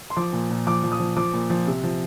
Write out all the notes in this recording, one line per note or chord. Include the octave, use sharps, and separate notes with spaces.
C6
F3 D6
A#2
A#2
F3 D6
F3
D#6
F3
F3 D6
A#2
F3
C3
F3